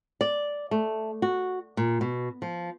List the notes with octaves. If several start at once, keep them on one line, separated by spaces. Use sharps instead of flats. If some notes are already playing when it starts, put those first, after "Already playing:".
D5
A3
F#4
A#2
B2
F3